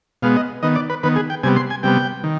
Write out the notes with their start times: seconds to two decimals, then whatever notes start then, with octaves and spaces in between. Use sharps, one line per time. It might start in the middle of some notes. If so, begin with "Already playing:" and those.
0.22 B2 G#3 B3 F5
0.36 D#5
0.63 D#3 B3 D#5
0.76 D5
0.90 B4
1.03 D#3 B3 B4
1.16 G#4
1.30 G5
1.43 C3 G3 B3 G#5
1.56 C6
1.70 G#5
1.83 C3 G3 B3 G5
2.24 D#3